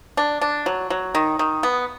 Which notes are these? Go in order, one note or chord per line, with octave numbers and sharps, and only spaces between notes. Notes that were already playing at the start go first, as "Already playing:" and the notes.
D4
D4
F#3
F#3
D#3
D#3
B3